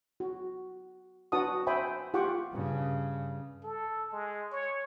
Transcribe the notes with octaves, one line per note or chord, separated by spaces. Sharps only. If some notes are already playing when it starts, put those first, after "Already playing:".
F#4
D4 F#4 B4 F#5 A5 D#6
C5 E5 G5 G#5 B5
F4 G4 F#5 G5 C#6 D6
G2 C#3
A4
G#3
C#5